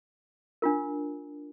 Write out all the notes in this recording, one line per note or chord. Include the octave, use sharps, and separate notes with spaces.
D4 F4 A#4